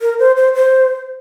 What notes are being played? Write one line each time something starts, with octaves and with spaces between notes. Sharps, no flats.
A#4
C5
C5
C5